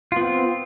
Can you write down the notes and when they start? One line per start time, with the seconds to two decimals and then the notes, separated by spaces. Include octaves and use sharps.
0.12 F4
0.16 B3
0.21 C4